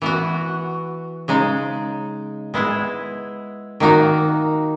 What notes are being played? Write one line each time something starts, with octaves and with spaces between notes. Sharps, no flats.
E3 B3 F#4
C#3 G#3 D#4
G#3 B3 E4 G#4
D#3 A#3 D#4 F#4